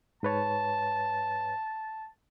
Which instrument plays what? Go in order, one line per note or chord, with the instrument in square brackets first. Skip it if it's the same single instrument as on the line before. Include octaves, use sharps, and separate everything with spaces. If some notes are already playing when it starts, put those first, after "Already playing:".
[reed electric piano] G#2 B4 C#5 [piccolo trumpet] A5